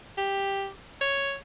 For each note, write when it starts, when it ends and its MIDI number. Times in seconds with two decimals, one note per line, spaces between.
0.17 0.69 67
1.01 1.35 73